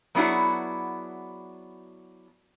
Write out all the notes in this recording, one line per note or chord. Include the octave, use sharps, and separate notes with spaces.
F#3 B3 D4 E4 F#4 G#4